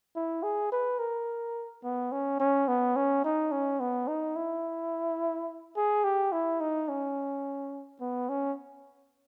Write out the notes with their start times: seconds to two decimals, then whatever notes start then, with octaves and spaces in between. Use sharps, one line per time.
0.16 E4
0.43 G#4
0.72 B4
0.99 A#4
1.84 B3
2.12 C#4
2.40 C#4
2.68 B3
2.96 C#4
3.25 D#4
3.52 C#4
3.80 B3
4.08 D#4
4.36 E4
5.77 G#4
6.04 G4
6.32 E4
6.61 D#4
6.89 C#4
8.01 B3
8.29 C#4